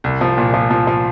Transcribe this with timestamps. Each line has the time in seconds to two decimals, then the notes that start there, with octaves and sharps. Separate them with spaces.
0.04 C2
0.21 F3
0.38 A#2
0.54 F3
0.71 F3
0.87 F3